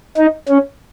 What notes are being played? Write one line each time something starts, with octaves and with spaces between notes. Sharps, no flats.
D#4
C#4